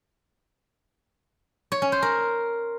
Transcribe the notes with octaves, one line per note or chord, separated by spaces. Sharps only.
C#5
C#4
C5
A#4